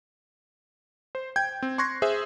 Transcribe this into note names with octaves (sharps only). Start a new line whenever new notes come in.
C5
G5 G6 G#6
C4
C6 C#6 F#6 G#6 A#6 C7
G#4 C5 E5